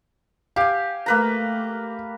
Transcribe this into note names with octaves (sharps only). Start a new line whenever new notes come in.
G4 F5 G#5
A3 A#3 B4 A#5